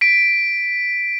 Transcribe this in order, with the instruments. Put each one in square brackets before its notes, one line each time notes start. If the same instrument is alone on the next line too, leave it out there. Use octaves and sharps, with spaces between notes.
[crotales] B6 D7